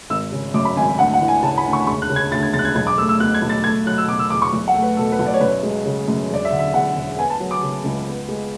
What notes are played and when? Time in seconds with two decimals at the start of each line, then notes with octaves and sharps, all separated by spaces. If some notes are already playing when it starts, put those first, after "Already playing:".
0.10 G#1 E6
0.32 C#3
0.54 F#2 D6
0.65 B5
0.76 G#1 G#5
0.99 D2 F#5
1.14 F#5
1.21 E3
1.28 G#5
1.43 C#3 A5
1.58 B5
1.65 D2
1.73 C#6
1.87 E1 C#6
2.02 F#6
2.09 C#3
2.16 G#6
2.31 D2 A6
2.43 G#6
2.54 E1 A6
2.59 F#6
2.65 G#6
2.75 B1 G#6
2.87 D6
2.98 A3 E6
3.09 E6
3.20 B2 F#6
3.34 G#6
3.42 B1
3.49 A6
3.64 A3 G#6
3.86 F#3 F#6
3.98 E6
4.08 B2 D6
4.19 E6
4.30 E2 D6
4.42 C#6
4.53 B1
4.68 F#5
4.74 A3
4.82 B4
4.97 B2 A4
5.12 B4
5.19 B1
5.27 D5
5.34 C#5
5.41 F#2 B4
5.48 C#5
5.63 G#3
5.85 C#3
6.08 F#2
6.29 E1 D5
6.45 E5
6.52 D3
6.59 E5
6.74 E2 F#5
6.96 E1
7.18 B3 G#5
7.30 A5
7.40 F#3
7.51 D6
7.63 C#3
7.84 C#2
8.07 B3
8.29 G#3